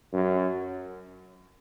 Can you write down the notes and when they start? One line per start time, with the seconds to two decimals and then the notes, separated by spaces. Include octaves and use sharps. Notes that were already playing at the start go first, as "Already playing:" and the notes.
0.13 F#2